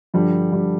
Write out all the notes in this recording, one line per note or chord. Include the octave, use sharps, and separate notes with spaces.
G2 D3 F3 G3
G2 D3 G3